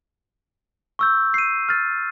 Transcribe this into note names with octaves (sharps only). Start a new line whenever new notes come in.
C#6 E6 G6
C7 D#7
F6 A6